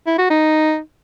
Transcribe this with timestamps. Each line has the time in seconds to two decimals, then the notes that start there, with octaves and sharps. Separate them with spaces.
0.07 E4
0.18 F#4
0.30 D#4